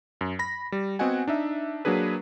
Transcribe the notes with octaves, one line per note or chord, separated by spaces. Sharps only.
F#2
B5 A#6
G3
B3 C4 F#4 D#5 F#5 G#5
D4 D#4 E5
F#3 A#3 D4 G#4 B4